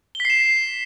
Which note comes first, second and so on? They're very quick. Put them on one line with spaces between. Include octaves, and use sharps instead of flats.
G7 B6 C7 E7